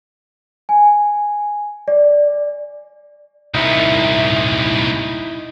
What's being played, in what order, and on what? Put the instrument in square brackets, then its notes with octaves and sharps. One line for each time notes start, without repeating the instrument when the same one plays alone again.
[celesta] G#5
D5
[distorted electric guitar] C2 A#2 [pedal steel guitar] D#4 E4